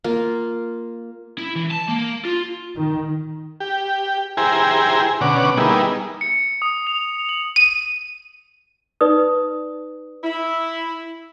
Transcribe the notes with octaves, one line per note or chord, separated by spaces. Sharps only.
A#3 F4
E4
E3
A5
A#3
F4
D#3
G4
E4 G4 G#4 C5 G#5 A#5
B2 D3 C#4 F#5 D6
G3 A#3 B3 D#4 E4 G#4
C#7
D#6
F7
F#7
D#7
D#4 B4 D5 D#6
E4